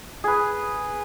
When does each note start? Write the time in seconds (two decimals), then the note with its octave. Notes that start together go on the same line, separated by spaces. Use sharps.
0.24 G#4 B4